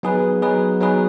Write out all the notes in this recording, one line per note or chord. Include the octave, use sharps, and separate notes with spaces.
F#3 B3 D#4 G#4 B4
F#3 B3 D#4 G#4 B4
F#3 B3 D#4 G#4 B4